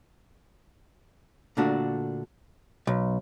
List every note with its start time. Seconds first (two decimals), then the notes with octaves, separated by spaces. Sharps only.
1.57 A#2 D3 A3 D4 F#4
2.87 B1